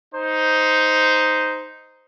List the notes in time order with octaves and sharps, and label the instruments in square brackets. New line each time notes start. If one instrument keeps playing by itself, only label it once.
[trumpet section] D#4 C5